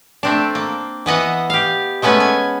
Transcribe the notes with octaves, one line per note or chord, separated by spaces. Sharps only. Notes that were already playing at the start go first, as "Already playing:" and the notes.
A3 C4 D4
A#3
E3 B3 D#5 F#5
G4 F5
G#3 A3 B3 C#4 B4 G#5
G#5